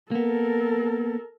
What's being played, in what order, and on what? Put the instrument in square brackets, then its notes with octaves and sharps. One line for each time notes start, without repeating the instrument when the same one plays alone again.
[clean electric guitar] A#3 B3 [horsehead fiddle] A4 A#4